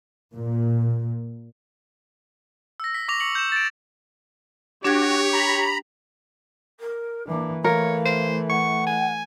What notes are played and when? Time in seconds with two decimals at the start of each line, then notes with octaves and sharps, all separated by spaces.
0.34 A#2
2.80 E6 A#6
2.94 B6
3.08 C#6 D6 A#6 F7
3.20 C#6 D6 C#7 F#7
3.35 G6 E7
3.52 A6 D7
4.84 D4 F#4 G4 C#5 G#6
5.33 A#5 B5
6.80 A#4
7.27 E3 A#3 D4
7.64 E3 A3 A#4 C#5 F5
8.06 C5
8.49 F#5 C#6
8.87 G#5